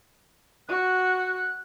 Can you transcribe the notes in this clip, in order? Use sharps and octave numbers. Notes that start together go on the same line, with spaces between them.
F#4 F#6